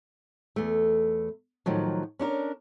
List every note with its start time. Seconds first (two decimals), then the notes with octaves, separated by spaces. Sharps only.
0.56 E2 A3
1.66 A2 D#3 F3 F#3
2.19 C#4 D4 E4 A#4